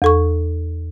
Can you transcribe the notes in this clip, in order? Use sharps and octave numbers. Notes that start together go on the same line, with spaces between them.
E2 A4 C#6